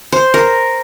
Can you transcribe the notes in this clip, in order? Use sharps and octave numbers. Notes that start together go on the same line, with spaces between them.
C5
A#4